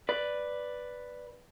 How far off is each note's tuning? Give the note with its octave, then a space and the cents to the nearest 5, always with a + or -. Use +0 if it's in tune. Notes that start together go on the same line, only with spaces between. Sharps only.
B4 +0 D5 +0